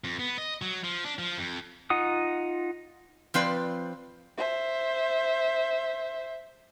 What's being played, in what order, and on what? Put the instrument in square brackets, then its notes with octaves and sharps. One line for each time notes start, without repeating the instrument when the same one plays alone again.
[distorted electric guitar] F2
B3
D#5
F#3
F3
D4
F3
F2
[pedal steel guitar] D#4 F4 F#5 D#6
[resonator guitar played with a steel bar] F3 C4 B4 D5
[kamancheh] C5 E5